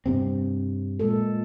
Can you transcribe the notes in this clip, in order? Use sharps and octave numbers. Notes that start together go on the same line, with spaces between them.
G2 C3 C4
A#2 G#3 A4